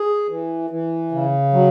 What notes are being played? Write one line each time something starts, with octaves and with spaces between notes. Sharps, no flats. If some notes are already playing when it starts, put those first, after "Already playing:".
Already playing: G#4
E3
E3
C#3
F#3